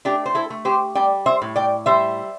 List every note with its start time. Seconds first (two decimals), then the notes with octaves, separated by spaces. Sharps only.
0.05 A3 D4 G4
0.26 C5
0.35 E4 A4
0.50 A3
0.65 G4 C5
0.95 G3 D5 G5
1.26 C5 E5
1.42 A2
1.56 D5 G5
1.86 G3 C5 E5